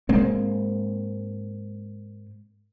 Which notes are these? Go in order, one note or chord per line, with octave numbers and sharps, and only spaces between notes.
G#2 G#3 A#3 C4